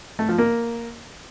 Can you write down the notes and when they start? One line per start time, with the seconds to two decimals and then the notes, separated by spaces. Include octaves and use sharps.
0.19 A3
0.29 F3
0.38 A#3